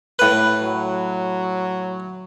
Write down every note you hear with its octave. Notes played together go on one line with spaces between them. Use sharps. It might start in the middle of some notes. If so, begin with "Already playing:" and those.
A2 B4
F#3